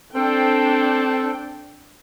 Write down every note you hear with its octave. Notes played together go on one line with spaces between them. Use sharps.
C4 D4 A4 G5